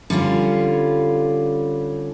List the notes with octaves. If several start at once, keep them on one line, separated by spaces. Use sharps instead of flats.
D3 G3 C#4 F4